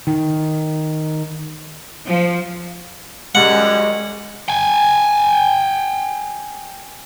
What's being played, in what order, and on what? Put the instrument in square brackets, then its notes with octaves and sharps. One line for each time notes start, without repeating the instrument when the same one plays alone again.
[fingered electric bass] D#3
[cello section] F3
[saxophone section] F#2 G3 [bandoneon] G#3 [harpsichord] F#5
[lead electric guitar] G5 G#5